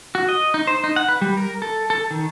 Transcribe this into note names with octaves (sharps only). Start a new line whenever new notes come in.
F#4
D#5
D#4
C5
D#4
F#5
B4
G3
A#4
A4
A4
D#3